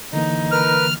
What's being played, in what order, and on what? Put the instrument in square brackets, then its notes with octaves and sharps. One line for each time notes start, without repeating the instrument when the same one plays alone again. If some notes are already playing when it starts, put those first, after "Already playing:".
[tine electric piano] D3 E3 A#3 [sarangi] D#4
[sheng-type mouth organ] A#4 B4 [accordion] F6